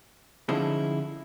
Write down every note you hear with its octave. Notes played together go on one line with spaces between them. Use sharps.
D3 F3 C#4 D#4 E4 G#4